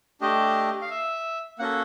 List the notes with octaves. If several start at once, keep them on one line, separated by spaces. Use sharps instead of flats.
A3 D4 G4 D#5
F5
E5
A#3 C#4 F#4 A4 F#5